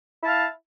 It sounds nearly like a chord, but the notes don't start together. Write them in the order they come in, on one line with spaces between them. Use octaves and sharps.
E4 A5 F5